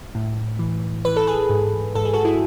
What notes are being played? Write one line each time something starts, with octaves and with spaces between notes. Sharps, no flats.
A2
E3
E3 B4
A4
G#4 B4
G#2
G#2 A4
G#4
F#4 A4
E4 G#4